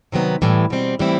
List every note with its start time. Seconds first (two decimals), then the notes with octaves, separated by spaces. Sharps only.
0.12 C3 D#3 F#3 B3
0.42 A2 E3 G3
0.70 B2 G3 C4
0.99 A2 E3 G3 C4 E4